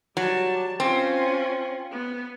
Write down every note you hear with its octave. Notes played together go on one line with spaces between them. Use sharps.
F#3 G3 A5
C4 C#4 F4
B3